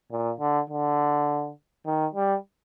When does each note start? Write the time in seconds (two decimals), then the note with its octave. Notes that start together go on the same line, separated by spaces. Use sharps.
0.11 A#2
0.40 D3
0.70 D3
1.86 D#3
2.15 G3